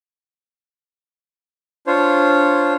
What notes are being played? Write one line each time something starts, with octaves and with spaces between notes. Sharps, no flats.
D4 F4 C5 C#5